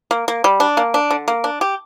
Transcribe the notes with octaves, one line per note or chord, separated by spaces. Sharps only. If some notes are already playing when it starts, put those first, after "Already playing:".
A#3
A#3
G3
D4
A#3
D4
D3
A#3
D4
G4